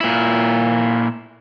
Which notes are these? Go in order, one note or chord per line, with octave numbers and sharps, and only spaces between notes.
A#2 E4